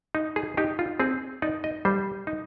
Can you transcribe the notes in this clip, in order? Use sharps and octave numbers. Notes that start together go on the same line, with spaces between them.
D#4
G#4
D#4 G4
F4
C4 G#4
D#4 D5
D#5
G3 C5
D#4